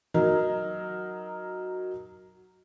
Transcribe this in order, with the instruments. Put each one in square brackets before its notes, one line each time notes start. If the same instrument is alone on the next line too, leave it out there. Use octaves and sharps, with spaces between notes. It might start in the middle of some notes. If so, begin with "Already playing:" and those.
[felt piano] F#3 D#4 A#4